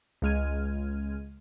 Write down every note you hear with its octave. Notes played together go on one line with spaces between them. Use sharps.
C#2 C#3 G#3 F6 G#6 D#7